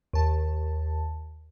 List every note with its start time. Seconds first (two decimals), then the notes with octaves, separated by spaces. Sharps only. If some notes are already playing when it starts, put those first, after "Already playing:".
0.13 D#2 A5